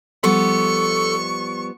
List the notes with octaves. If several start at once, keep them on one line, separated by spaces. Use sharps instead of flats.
F3 G3 B3 A4 C#6